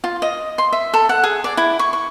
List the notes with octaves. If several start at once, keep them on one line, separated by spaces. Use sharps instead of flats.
F4
D#5
C6
E5
A4
F#5
G#4
D5
E4
C#6
C#6